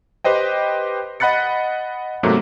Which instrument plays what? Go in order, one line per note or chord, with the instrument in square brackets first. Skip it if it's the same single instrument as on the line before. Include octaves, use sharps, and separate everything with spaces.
[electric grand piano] G4 B4 C5 D#5 G5
D#5 F#5 B5 F#6 A6 C#7
G#2 C3 F#3 A3 A#3